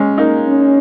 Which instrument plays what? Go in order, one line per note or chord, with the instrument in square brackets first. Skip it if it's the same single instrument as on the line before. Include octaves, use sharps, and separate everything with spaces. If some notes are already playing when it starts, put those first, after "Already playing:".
Already playing: [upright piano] G#3 C#4
A#3 D#4
[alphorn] C#4